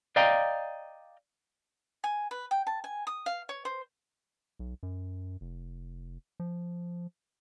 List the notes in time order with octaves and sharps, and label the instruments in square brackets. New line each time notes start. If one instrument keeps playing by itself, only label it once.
[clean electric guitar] D5 D#5 F5 G5 A#5
[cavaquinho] G#5
B4
G5
A5
G#5
D#6
F5
C#5
C5
[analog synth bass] B1
F#2
F1
F3